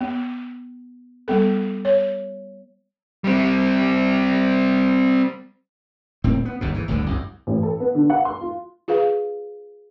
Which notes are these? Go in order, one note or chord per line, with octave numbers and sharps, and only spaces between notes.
B3
G3 B3 A4
C#5
G3 C4
D#1 A2 C4
B3
G1 D#2 G#2 B2
G#2 E3
G1 D2 A2 D3
C2 F#2
A1
A4
B3
D3
F#5
C6
F4
F4 G#4 B4 F5